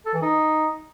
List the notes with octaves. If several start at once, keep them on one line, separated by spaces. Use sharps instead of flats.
A4
E3
D#4